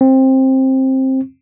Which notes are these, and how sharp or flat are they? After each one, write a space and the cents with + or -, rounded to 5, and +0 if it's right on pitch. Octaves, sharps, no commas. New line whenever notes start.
C4 +15